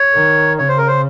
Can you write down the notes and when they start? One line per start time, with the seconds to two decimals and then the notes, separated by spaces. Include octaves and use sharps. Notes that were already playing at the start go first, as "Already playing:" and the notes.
Already playing: C#5
0.14 D#3
0.58 C#3 C#5
0.68 C5
0.78 A#4
0.87 C5